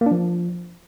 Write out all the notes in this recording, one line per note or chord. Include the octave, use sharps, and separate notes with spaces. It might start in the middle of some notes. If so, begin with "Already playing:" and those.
A#3
D4
F3